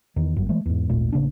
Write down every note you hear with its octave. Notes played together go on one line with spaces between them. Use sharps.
E2 D#3
G1 F#2
E3 G#3 A3
E2 G#2
G#1 D#2 A#2 A3
A1 C#3 A#3 D4